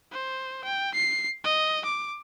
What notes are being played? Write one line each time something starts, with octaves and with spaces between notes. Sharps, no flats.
C5
G5
C7
D#5
D6